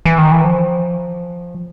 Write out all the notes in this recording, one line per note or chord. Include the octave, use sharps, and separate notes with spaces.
E3
D#3
E3
F3